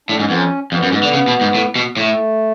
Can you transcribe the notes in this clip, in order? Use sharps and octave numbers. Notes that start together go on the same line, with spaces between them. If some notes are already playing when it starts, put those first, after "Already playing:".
A2 D4
G#2 C#4
B3
F2 C#4
F2 B3
F#2
C#4
G#2 B3
D3
C#3
B2
G#2
A2
B2
A2 A3